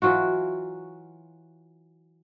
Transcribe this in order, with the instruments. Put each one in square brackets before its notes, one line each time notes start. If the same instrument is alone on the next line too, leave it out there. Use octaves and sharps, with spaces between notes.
[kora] E3 F#3 F4 F#4